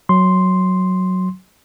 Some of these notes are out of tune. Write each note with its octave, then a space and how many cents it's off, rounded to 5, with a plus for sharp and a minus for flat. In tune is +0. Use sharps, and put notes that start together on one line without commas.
F#3 +0 C6 +0